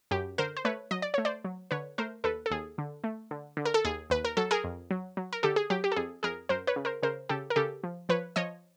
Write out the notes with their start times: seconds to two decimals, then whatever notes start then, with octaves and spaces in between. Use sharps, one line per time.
0.11 F#2 G4
0.38 D3 A#4 C5
0.57 C5
0.65 A3 B4 C#5
0.91 F#3 D#5
1.02 D5
1.14 A3 C#5
1.25 C5 D5
1.45 F#3
1.71 D3 B4 C#5
1.98 A3 A#4 C5
2.24 D#2 A4 B4
2.46 A4
2.50 D#2 G#4
2.78 D3
3.04 A3
3.31 D3
3.57 D3
3.65 A#4
3.74 A4
3.85 D#2 G#4
4.10 D#2 B4
4.25 A#4
4.37 F#3 A4
4.51 G#4 A#4
4.64 F2
4.91 F#3
5.17 F#3
5.33 A#4
5.43 D3 G4 A4
5.56 G#4
5.70 F#3 G4
5.84 G4
5.92 A4
5.96 F2 G#4
6.23 F2 G#4 A#4
6.49 F#2 A#4 C5
6.67 B4 C#5
6.76 C#3
6.85 A#4 C5
7.03 C#3 A#4 C5
7.29 C#3 G4 A4
7.50 A#4
7.56 C#3 G4 A4
7.84 F3
8.09 F3 B4 C#5
8.36 F3 C#5 D#5